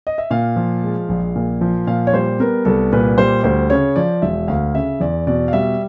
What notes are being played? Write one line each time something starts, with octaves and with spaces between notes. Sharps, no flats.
D#5
E5
A#2 F5
F3
G#3
A#1
A#2
F3
A#2 F5
C#5
G3 C5
B3 A#4
C2 A4
A#2 B4
G3 C5
D2 C5
C#3 C#5
F3 D5
E1 E5
D2 F5
C#3 E5
E2 D5
B2 D5
F5
G3 E5